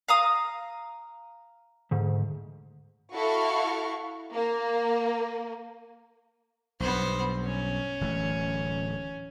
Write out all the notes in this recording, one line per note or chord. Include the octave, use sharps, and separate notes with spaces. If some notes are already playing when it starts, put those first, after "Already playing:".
F5 A#5 D#6
D2 G#2
E4 F#4 A4 F5 C#6
A#3
B1 G2 B3 C5
C#4
D1 E3 A3